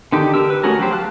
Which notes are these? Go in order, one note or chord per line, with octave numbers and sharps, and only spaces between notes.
D3 D#3 D#4 G4
D3 G4 A#4 E6
B4
A3 C#4 F#4 G#4 A#4
F3 F#3 G4 C5
F5 A5 F6 F#6